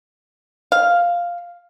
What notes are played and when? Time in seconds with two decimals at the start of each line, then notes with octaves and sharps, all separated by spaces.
0.72 F5